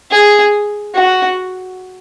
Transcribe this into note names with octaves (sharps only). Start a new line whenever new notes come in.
G#4
F#4